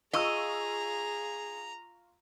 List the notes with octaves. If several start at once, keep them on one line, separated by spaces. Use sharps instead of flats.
F4 G#4 D#5 A#5 C#6 E6